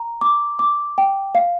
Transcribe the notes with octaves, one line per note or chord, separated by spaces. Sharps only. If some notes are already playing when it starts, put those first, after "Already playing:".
Already playing: A#5
D6
D6
G5
F5